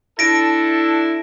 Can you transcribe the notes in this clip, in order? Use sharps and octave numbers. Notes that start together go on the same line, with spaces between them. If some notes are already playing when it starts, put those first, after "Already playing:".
D4 E4 A4 A#6 D7